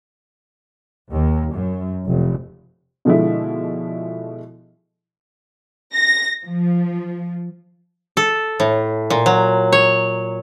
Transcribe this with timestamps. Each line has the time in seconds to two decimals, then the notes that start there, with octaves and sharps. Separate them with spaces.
1.11 D#2
1.53 F#2
2.08 F1
3.05 B2 D3 F3 G#3 E4
5.94 A#6
6.44 F3
8.17 A4
8.60 A2
9.10 A#2
9.26 F#3
9.72 C#5